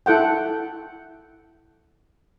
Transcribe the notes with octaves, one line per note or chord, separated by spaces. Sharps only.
E4 A4 F#5 G5